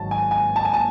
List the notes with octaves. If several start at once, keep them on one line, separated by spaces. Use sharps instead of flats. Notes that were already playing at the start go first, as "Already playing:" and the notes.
Already playing: G#1 G#2 F#3 A5
G#5
G#5
A5
G#5
A5